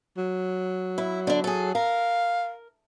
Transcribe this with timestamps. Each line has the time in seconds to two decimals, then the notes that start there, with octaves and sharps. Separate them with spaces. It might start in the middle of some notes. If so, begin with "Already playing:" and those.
0.17 F#3
0.98 E4
1.27 D3 D4
1.44 G#4 A4
1.75 A#4 F5